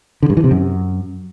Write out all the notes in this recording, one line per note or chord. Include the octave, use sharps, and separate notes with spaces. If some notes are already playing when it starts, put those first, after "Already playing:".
D3
G2
E3
C3
F#2